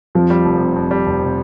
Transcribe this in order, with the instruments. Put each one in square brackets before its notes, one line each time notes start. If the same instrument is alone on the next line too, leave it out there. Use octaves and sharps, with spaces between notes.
[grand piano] F2 [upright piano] F3
[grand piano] G3
F1
C3
F2
G3
F1
C3